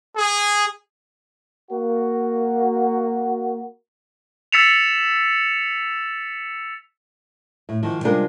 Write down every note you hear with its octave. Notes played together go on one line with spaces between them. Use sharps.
G#4
A#3 F#4
E6 A6 B6 C#7 E7 F7
A2
G#2 D#3 F3
C3 G3 G#3 D4 F4 A#4